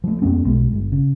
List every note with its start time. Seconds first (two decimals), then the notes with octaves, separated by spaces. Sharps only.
0.04 F3 A3
0.22 F2 A#3 B3 C#4
0.45 B1 G#3
0.72 G1
0.92 C#3